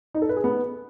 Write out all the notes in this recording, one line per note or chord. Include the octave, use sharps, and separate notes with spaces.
D#4
A4
B4
G#4
B3